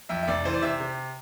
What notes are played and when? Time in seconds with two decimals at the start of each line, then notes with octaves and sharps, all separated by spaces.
0.09 F2 E5
0.23 E5
0.28 F1 D5
0.45 E3 C5
0.54 D5
0.62 C3 E5
0.80 C3